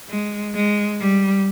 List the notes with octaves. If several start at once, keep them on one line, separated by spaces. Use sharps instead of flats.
G#3
G#3
G3